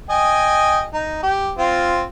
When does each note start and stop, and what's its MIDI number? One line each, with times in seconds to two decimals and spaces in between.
0.10 0.86 75
0.10 0.86 79
0.10 0.86 80
0.94 1.21 63
1.23 1.51 67
1.58 2.02 60
1.58 2.02 65